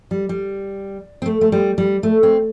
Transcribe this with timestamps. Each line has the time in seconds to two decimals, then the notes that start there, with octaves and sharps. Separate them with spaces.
0.11 G3
0.29 G3
1.22 C4
1.26 A3
1.41 A3
1.52 G3
1.78 G3
2.03 A3
2.23 C4